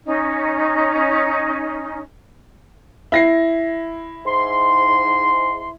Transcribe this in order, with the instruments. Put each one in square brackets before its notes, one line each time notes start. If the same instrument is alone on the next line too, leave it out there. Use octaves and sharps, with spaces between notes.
[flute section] C#4 D#4
[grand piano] E4 A#6 C7
[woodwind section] G#2 C6